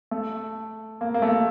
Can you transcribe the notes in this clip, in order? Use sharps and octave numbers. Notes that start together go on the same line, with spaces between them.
A3
A#3
A#3
A3